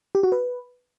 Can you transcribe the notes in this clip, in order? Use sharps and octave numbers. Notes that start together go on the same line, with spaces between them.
G4
F#4
B4